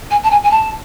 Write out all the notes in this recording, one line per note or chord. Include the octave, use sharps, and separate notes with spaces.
G#5
A5
G#5
G#5
A5